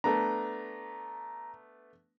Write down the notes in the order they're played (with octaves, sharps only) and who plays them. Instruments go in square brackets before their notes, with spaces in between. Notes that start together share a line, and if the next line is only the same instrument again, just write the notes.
[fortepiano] A3 B3 D4 [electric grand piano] A#5